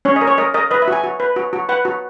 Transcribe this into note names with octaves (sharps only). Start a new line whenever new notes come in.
C#4 C#5
D#5
A#4
C#5
A#4 D#5
A#4 D#5
B4 D#5
E5
F#4 G#5
F#4
B4
F#4
F#4
B4 F#5
F#4